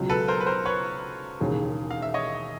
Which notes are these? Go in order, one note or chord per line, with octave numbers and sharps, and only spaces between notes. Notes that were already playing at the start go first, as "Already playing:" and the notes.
Already playing: C#2 B2 F#3
A4 B4
A#4 C5
B4
A#4 C5
B4 C#5
E1 D#2 C#3
F5
E5
C#5 D#5